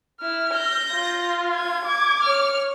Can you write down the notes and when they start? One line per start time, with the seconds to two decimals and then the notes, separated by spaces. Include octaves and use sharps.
0.21 E4 F6
0.54 G6 A#6
0.92 F4
1.55 G#6
1.85 D6
2.22 C#5 F6